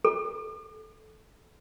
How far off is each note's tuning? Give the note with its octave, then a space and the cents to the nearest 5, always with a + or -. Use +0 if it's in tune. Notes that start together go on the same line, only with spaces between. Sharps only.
A4 -25